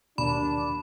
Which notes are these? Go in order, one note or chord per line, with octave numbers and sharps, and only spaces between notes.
D#2 D4 A#4 B5